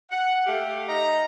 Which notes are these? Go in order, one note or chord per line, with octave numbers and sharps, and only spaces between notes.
F#5
A3 G4 F5
D#4 D#5 A#5